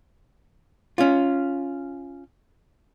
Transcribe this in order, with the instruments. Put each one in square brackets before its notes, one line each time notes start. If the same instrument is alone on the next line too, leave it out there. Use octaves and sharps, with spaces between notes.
[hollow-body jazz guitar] C#4 F4